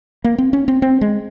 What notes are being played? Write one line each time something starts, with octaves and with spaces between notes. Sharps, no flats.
A#3
C4
C#4
C4
C4
G#3